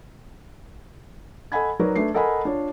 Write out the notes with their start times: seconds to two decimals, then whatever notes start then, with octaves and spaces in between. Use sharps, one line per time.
1.52 A4 D#5 F#5 G#5 B5 G#6
1.79 F#3 D#4 F#4 A#4 B4 D5
1.96 A3 D4 B4 C7
2.14 A4 A#4 D#5 F#5 G#5 B5
2.45 D4 F4 C#5